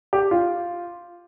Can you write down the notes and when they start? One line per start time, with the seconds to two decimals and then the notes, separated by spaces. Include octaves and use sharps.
0.13 G4
0.31 F4